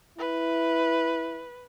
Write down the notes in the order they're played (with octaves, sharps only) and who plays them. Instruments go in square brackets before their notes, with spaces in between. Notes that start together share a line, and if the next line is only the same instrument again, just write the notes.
[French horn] E4 [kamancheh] B4